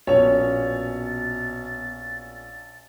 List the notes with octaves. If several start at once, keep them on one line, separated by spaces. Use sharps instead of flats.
A#1 B2 C#4 C#5 A6 F7